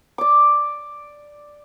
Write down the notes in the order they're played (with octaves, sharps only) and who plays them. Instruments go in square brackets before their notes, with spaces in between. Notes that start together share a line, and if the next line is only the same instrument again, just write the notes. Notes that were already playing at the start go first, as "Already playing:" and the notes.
[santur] D5 D6